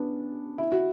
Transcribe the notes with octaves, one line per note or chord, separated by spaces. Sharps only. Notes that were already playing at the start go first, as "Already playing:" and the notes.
Already playing: B3 C#4 D4
E4
F#4